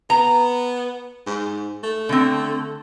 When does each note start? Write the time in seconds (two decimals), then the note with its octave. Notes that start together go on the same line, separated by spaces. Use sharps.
0.10 B3 A#5
1.26 G#2
1.83 A3
2.09 D3 C4